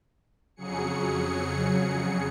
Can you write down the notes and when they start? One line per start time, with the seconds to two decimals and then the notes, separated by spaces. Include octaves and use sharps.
0.56 F2 C#3 F#3 G#4 C#7